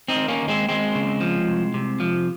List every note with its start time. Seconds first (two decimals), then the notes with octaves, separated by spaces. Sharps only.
0.08 C4 D#4
0.16 D#3
0.28 A#3 C#4
0.42 D#2
0.48 G#3 C4
0.69 D#2 G#3 C4
0.95 C#3
1.21 F3
1.47 C2
1.74 C3
2.00 F3